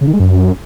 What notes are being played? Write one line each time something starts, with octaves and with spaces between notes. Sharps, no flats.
C#3
D#3
G#3
F#2